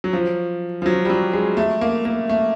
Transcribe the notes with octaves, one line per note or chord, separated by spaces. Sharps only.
F#3
F3
F3
F#3
G3
F#3
G#3
A3
A#3
A#3
A3